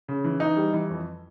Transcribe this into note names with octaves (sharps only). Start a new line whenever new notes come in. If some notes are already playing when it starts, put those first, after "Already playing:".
C#3
E3
E3 D#4
G3
E3
F2